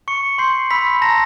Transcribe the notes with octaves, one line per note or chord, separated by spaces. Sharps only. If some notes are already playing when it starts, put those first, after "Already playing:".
C#6 C#7
C6 G6 C7
B5 E6 B6
A5 A#5 A#6